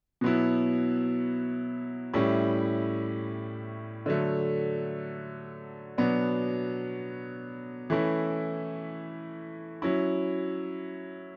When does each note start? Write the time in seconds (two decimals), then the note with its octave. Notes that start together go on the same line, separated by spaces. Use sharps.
0.21 B2 F#3 B3 E4
2.14 A2 G3 C#4 E4
4.06 D3 F#3 A3
5.98 B2 F#3 B3 D4
7.90 E3 A3 C#4 E4
9.82 F#3 C#4 E4